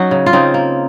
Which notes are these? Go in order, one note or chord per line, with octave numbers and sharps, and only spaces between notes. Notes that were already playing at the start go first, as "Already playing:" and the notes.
Already playing: F#3 C#4 D#4 F#4
C#3
F4
C#3 C4 D#4
A#3